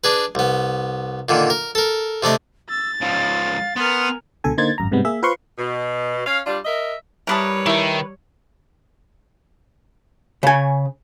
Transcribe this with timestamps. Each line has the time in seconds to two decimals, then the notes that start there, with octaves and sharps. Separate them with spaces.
0.04 D4 G#4 B4
0.35 C2 B3
1.29 A#2 D3 D#3
1.50 A#4
1.75 A4 A#4
2.23 C3 A3 D4 D#5
2.70 E6 A6
3.01 C#2 F3 F5
3.76 B3 A#4 G#5 C6 F6
4.44 C#2 B2 D3 A4 G#5
4.58 D3 A#3 D#4 C5 G#6 A6
4.78 G#1 F#2 A#5
4.91 G#2 C3 G3 G#3 B3
5.05 A#3 G#4 E5
5.22 F4 B4 C5 F5 C6 C#6
5.58 B2
6.26 C#4 F5
6.46 G3 D4 F4
6.65 A#4 D#5 E5
7.27 E3 G3 E4 A#4 B4 C#5 A5 D#6
7.66 D#3 A3 E4
10.43 C#3 G#5